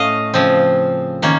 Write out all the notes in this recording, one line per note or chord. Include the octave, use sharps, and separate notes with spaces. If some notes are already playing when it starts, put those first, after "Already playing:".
Already playing: A2 A3 C#4 D#5 F5
C#3 F3 C4
D#3 A#3 C#4